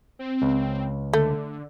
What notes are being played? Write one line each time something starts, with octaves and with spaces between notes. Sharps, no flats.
C4
C#2
D3 A3